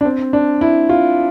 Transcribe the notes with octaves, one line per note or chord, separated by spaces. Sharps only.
D4
C4
D4
E4
F4